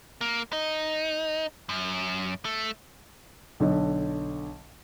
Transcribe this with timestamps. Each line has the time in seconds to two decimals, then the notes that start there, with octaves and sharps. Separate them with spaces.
0.21 A#3
0.53 D#4
1.69 F#2
2.45 A3
3.60 B1 D3 D#5